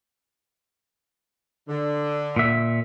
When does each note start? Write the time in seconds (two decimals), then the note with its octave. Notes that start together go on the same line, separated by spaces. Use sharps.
1.69 D3
2.36 A#2 E5